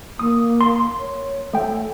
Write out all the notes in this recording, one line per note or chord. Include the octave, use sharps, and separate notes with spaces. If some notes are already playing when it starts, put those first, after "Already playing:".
A#3 D#6
C6
C#5
A3 A4 G5